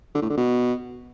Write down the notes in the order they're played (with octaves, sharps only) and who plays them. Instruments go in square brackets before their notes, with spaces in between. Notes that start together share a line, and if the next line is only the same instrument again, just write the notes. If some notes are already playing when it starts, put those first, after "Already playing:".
[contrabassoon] D3
A2
D3
B2